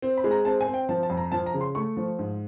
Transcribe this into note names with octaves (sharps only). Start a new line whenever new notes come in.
C4
B5
G#3
A#5
C4 A5
G#5
C4
G5
F3 A5
A5
F2
A#5
F3 A5
A#5
C#3
C6
A3 C#6
F3
G#2